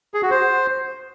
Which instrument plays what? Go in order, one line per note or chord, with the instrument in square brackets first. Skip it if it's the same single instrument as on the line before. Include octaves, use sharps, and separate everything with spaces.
[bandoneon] G#4
F#4
C5